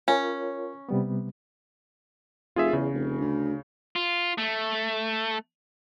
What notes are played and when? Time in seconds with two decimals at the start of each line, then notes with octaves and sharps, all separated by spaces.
0.08 C#4 F4 A#4 C#5
0.89 C3 G3 B3
2.56 F1 F4 G#4 E5
2.73 E2 C#3
2.93 F1
3.21 D2
3.96 F4
4.38 A3